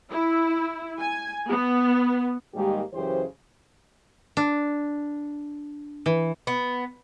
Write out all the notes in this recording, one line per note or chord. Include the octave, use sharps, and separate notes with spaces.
E4
G#5
B3
G#2 D#3 G3 G#3 A#3 G4
F#2 C#3 E3 G4 C5
D4
E3
B3